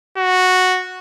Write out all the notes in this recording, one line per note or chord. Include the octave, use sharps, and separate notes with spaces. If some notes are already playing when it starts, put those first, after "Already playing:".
F#4